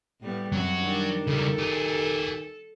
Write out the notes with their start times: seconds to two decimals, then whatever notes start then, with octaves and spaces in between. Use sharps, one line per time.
0.21 A2 G3 B3
0.52 F#2 F#3 C4 F#4
0.82 D#3 G3 D4
1.27 C#3 G3 A4
1.59 G4 G#4